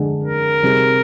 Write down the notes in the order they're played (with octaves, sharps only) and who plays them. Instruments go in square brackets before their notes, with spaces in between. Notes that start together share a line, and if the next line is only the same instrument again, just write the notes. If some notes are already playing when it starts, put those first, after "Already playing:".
Already playing: [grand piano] D3 G#3 D4 G#4
[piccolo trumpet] A#4
[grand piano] C3 G3 C4 D#4 G#4